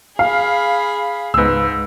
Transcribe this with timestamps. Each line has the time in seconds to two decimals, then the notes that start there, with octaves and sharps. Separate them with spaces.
0.19 G#4 F5 B5
1.34 C#2 G#2 B4 E6